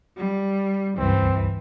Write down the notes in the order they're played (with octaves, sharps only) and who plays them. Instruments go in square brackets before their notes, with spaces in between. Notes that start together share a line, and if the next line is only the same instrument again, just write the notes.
[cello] G3
[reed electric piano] C#2 G2 [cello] E3 [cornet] C4